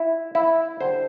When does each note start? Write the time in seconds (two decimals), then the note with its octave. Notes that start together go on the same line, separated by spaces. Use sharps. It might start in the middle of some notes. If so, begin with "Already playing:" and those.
Already playing: E4
0.35 E4
0.81 D3 G3 C5